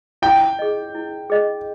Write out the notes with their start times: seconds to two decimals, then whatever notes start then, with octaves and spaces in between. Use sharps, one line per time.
0.22 E4 G5
0.59 G#4 D#5
0.95 E4
1.30 G#4 D#5